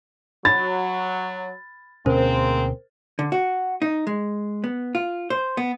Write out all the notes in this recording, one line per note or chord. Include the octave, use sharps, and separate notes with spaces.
F#3 B5 A6
D2 B2 G#3 A#3 C4 C#4 A#4 C5
D3
F#4
D#4
G#3
B3
F4
C5
B3